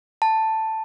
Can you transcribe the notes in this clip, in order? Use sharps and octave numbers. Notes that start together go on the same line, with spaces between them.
A5